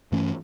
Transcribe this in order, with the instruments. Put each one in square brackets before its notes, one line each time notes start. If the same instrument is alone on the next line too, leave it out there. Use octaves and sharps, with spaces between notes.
[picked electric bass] G2 E3 A3 C#4